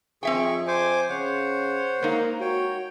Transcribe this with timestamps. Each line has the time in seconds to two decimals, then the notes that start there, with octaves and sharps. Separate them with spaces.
0.23 F2 C4 G#4 E5 G5 C#6
0.67 C5 G#5 D6
1.09 C#3 C5 C#5 F#5
2.02 G#3 A#3 D#4
2.40 F#4 C#5 G5